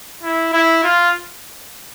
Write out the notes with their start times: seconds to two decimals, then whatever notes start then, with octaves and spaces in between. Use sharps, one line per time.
0.23 E4
0.53 E4
0.84 F4